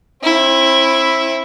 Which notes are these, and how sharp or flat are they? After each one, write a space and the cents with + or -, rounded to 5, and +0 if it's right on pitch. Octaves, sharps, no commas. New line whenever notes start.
C4 +35 E4 +0